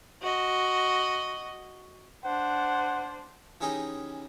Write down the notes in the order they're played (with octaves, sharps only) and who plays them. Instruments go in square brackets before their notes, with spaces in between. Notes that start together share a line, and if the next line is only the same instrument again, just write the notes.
[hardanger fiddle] F#4 D#5
[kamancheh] D4 C5 [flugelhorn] F#5
[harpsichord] E3 C#4 D#4 G4 G#4 D#5